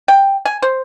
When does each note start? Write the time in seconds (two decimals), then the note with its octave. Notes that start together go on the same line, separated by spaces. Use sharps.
0.08 G5
0.45 G#5
0.62 C5